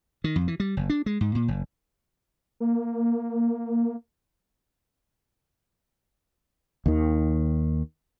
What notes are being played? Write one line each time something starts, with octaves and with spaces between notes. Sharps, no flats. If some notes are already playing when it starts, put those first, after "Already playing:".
D#3
F2
E3
G3
F#1
D4
G#3
G#2
A#2
F#1
A#3
D#2 D#3